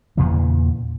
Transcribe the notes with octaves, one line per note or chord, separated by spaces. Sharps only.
E2 A#2 C#3 E3